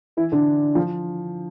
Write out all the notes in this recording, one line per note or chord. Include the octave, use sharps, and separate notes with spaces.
E3 E4
D3 D4
F3